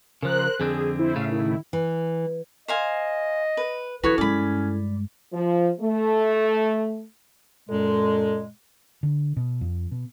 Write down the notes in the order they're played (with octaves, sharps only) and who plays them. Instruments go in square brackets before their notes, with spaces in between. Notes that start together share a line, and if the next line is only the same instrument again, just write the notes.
[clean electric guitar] C#3 F3 [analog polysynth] A#4 C5 F#6
[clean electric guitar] F2 D3 C4 [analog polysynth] G#4
[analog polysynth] E4 C5
[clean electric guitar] A2 C#3 A3 [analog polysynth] E5 F5
[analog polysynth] D#3 E4
[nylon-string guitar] E3
[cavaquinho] C5 F5 G#5 [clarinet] D#5
[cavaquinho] B4
[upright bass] E3 D4 [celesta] E4 A4 G#6 [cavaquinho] F#4 C#5 [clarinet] B4
[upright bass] G2 G#3 [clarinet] C#4 [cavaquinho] D5 B5
[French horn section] F3
A3
[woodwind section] F#2 A#2 G#3 [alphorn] A4
[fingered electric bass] D3
B2
F2
B2